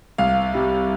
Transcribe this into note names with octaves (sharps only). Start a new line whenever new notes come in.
C2 F5
C3 G3